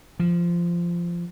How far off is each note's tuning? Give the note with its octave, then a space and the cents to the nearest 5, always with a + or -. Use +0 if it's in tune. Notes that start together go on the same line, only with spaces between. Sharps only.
F3 -15